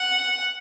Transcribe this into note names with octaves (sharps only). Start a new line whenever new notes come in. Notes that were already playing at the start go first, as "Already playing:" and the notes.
Already playing: F#5